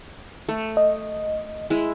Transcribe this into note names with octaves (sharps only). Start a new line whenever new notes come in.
A3
D#5
G#3 E4